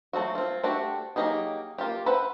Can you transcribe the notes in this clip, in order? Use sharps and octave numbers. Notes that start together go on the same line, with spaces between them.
F#3 A3 C4 F#4
C4 F4
A3 C4 D4 F#4 G4
F#3 A#3 D#4 G4 G#4
A#3 F4 G4
B4 C5 E5 F#5 B5